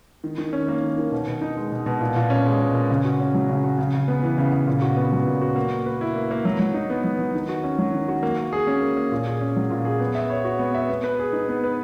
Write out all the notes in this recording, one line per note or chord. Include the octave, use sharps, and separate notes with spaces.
D#3
D#3
C#4
A#3
D#3
D#3
B2
B2
D#4
G#3
B2
B2
A#2
A#2
C#4
G#3
A#2
A#2
C#3
F#4
C#4
F#3
C#3
F#4
C#3
C#3
B3
E3
C#3
C#3
A#2
F#4
B3
F#3
A#2
F#4
A#3
A#3
B4
E4
A#3
A#3
F#3
F#3
D#4
B3
F#3
F#3
D#3
F#4
C#4
F#3
D#3
F#4
A#3
A#3
G#4
C#4
A#3
A#3
A#2
G#4
C#4
F#3
A#2
G#4
B3
E5
C#5
F#4
B3
E5
B3
B4
G#4
D#4
B3
B4